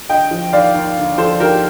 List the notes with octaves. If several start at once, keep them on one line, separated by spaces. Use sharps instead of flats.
D3 D#5 G5
F3
D#2 D5 F5
D#2
D3
F3 A4 C5
D#2 G4 A#4